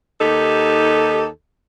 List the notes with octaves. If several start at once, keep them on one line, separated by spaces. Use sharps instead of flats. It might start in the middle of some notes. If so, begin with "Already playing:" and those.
D#2 D#4 G4 A4